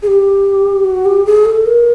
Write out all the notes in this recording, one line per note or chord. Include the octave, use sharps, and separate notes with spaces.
G#4
G4
F#4
G4
G#4
A4
A#4